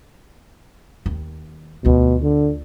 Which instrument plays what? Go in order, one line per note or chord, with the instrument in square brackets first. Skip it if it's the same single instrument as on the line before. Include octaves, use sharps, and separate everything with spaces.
[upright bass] D#2
[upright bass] D2 F4 [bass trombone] B2
[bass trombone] D3